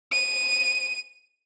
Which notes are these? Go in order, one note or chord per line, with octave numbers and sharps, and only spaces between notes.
D#7